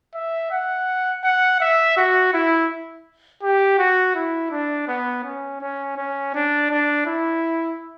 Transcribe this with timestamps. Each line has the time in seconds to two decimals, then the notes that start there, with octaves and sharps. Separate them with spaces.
0.15 E5
0.51 F#5
1.24 F#5
1.60 E5
1.97 F#4
2.34 E4
3.43 G4
3.79 F#4
4.15 E4
4.51 D4
4.88 B3
5.24 C#4
5.61 C#4
5.97 C#4
6.34 D4
6.71 D4
7.06 E4